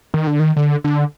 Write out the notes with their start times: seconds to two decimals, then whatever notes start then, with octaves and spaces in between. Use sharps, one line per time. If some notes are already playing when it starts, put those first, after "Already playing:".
0.14 D#3
0.27 D3
0.39 D#3
0.56 D3
0.84 D3